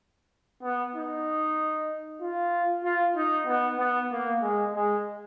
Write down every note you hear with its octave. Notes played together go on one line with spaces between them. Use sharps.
B3
D#4
F4
F4
D#4
B3
B3
A#3
G#3
G#3